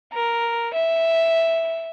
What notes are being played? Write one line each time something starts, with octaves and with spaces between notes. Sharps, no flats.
A#4
E5